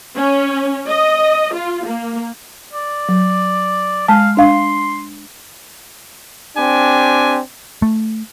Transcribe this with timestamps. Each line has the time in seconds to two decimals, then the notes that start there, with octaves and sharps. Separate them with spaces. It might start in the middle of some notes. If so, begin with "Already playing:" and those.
0.16 C#4
0.89 D#5
1.55 F4
1.86 A#3
2.73 D5
3.09 F#3
4.08 G#3 F5 A5
4.37 D4 F5 C6
6.57 C4 D4 G4 G#5
7.82 A3